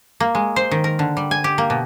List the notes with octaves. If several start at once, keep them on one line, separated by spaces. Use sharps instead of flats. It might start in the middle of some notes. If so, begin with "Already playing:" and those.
A#3
G#3
C5
D#3
A#4
D3
G3
G#5
G4
A#3
B2